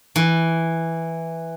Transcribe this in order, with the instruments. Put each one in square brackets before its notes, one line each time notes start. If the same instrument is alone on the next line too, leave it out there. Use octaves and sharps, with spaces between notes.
[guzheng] E3